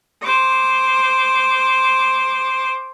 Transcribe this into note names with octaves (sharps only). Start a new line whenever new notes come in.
C5 D6